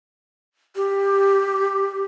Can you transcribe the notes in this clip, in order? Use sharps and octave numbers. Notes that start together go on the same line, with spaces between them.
G4